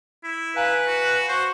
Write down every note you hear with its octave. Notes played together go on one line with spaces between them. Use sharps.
E4
B4 F5 G#5 A#5
F#4
F#4 C5